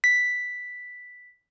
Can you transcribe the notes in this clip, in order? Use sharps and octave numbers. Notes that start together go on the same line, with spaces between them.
B6